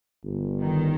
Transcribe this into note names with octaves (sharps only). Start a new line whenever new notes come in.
G1
D#3